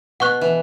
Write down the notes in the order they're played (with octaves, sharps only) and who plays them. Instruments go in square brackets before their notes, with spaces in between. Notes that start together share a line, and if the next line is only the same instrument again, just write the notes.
[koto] B2 [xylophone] F#5 C#6 F#6
[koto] E3